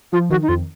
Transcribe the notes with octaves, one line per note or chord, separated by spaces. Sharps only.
F3 F4
D#3 F#4
D#4
F2 F4